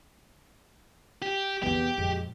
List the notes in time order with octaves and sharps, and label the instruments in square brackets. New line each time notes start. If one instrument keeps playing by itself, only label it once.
[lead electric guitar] G4
[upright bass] E2 C3 [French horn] B3 [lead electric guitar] G4
[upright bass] F2 A#2 [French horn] G#3